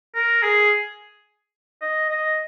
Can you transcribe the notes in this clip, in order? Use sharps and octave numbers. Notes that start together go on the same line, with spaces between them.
A#4
G#4
D#5
D#5